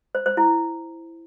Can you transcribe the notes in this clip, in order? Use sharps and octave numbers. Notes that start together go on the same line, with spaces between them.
C5
C5
E4